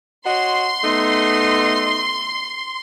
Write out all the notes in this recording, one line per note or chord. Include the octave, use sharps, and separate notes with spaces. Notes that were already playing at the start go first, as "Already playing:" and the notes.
F#4 C#5 D#5 C6
A3 B3 D#4